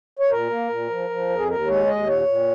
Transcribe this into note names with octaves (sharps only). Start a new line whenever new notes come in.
C#5
A#2 A#4
A#3
A#2
F3
F3
F2
G#4
D#2 A#4
G#3 C#5
D#2 D#5
A#2 C#5
A#2